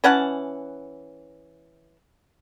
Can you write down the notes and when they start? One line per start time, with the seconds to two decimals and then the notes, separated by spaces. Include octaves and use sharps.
0.04 E3 C#4 F#5 A5